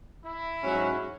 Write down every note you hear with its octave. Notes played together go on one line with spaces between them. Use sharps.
E4
G#2 F#3 C#4 F#4